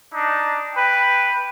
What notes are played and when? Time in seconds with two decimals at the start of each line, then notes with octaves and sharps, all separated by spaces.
0.12 D4 D#4
0.75 B4 G5